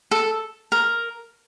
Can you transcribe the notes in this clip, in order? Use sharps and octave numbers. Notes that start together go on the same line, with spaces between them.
A4
A#4